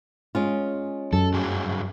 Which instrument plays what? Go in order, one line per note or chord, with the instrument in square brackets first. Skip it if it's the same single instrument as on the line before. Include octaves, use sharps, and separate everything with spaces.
[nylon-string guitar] G#3 C#4 F4
[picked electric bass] F#2 [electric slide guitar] A4
[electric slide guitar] G2 F#3 G#4